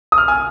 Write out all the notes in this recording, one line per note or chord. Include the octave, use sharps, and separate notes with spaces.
D#6
F6
G#5